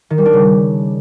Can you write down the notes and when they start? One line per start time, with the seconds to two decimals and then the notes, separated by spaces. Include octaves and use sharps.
0.10 D#3
0.18 G3
0.26 D4
0.33 C#3